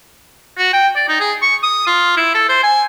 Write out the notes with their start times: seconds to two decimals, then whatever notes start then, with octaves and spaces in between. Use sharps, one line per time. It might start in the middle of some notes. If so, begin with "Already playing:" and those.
0.58 F#4
0.73 G5
0.96 D5
1.08 D#4
1.20 G#4
1.42 C#6
1.63 D#6
1.87 F4
2.17 E4
2.34 A4
2.49 C5
2.63 G#5